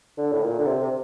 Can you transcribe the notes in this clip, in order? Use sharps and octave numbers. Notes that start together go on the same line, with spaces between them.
D3
A2
A#2
D3
C3
C3